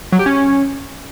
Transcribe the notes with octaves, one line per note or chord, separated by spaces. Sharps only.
F#3
G4
C#4